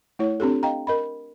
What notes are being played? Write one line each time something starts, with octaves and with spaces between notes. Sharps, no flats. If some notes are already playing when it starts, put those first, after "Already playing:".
A3 E4 C#5
C4 D4 G4 A4
D#5 F5 G5 A#5
A#4 D#5 B5